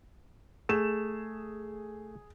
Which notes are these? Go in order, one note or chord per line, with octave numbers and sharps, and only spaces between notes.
A3 G#4 E7